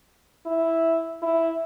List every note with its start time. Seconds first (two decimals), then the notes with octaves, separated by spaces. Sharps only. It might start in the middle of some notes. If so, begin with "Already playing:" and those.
0.46 E4
1.22 E4